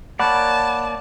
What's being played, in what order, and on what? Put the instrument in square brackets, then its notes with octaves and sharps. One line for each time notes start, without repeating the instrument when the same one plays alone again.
[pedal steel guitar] A#3 C#5 D5 [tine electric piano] F#5 B5 F#6 [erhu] A5